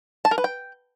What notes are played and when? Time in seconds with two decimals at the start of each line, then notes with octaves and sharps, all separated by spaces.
0.25 A5
0.31 A#4
0.38 B4
0.44 G5